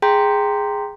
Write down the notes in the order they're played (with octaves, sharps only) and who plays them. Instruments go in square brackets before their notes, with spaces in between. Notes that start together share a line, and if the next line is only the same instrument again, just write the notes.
[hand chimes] G#4 G5 A#5 C6 G6 B6